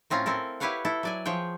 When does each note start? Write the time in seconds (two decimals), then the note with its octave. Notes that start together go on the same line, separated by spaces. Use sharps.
0.10 A2 C4 C#4 F4 A#5
0.26 C4 E4 A4 A#4
0.60 E4 G4 B4 C#5 F5 F#5
0.85 E4 A4
1.03 F#3 D5 G#5
1.26 F3 G#4 C#5 G5